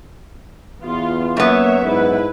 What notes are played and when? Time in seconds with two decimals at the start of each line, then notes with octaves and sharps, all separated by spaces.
0.81 E2 B3 F4
1.37 F#2 A#3 B3 C#5 E5
1.85 G#2 E4 B4